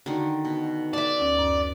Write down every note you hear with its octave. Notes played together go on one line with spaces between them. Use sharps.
D3 D#3 F#4
B2
D5 E5 A5
D2 C#4
F#2